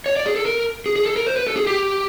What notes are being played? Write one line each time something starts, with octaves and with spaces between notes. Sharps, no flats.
C#5
D5
G#4
A4
A#4
G#4
G#4
A4
A#4
C5
B4
A4
G#4
G4